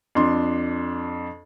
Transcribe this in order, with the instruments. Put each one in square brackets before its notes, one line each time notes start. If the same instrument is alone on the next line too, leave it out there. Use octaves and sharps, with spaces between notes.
[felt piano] F2 D4 C6